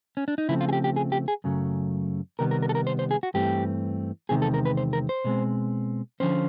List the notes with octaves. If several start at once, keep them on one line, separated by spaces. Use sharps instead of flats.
C#4
D4
D#4
C#3 F3 A3 C4 E4
F4
G#4
G4
G4
G#4
G4
G#4
F#2 C#3 F#3 A3
C3 D#3 G3 B3 A#4
A#4
A#4
A4
A#4
C5
C5
G#4
F#4
G2 E3 A3 C4 G4
E2 C3 D#3 G#3 C4 G#4
A4
A#4
B4
C5
A#4
C5
B2 G#3 C4
D3 F3 A3 C#4 C5